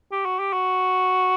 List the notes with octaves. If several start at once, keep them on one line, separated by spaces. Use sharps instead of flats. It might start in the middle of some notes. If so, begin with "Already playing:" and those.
G4
F#4
G4
F#4